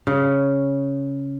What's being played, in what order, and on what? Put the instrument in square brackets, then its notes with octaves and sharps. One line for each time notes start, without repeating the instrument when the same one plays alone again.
[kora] C#3